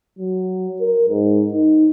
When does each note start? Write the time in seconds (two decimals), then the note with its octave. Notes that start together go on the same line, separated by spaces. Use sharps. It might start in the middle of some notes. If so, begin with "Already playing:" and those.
0.19 F#3
0.81 A#4
1.09 G#2
1.53 D#4